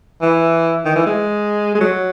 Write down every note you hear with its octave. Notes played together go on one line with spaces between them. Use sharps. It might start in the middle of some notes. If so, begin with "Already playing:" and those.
E3
D#3
E3
G#3
G#3
F#3